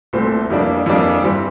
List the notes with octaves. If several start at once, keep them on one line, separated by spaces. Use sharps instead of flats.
C2 A#2 A3 C4
F2 E3 G3 A#3 D4
F2 E3 G3 A#3 D4
G2 E3 G3 C4